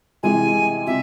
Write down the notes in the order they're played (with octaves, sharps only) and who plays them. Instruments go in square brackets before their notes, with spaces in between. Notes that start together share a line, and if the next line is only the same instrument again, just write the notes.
[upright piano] C3 E3 G#3 [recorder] G#5
[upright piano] C3 [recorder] E5